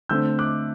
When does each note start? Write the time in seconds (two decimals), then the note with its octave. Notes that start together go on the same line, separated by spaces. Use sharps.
0.09 D3 A3 C4 E6 G6
0.39 D6 F#6